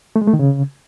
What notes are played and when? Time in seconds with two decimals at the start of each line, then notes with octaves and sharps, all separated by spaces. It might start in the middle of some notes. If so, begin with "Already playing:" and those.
0.16 A3
0.22 G#3
0.27 A3
0.33 D#3
0.39 C#3